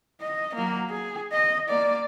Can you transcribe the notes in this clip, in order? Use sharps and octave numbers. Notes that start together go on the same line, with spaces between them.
D#5
F#3 A#3
G#4
D#5
A#3 D5